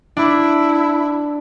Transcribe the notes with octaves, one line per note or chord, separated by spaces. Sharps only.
D4 E4